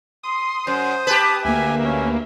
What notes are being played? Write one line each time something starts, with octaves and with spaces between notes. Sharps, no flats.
C6 D#6
F#2 C5
G4 B4 A5
D2 A#3 E5 G#5
C#4